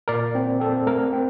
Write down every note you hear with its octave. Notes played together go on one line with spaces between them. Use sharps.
A#2 A#4 D5
C4
C4 A4
A3 A#4
C4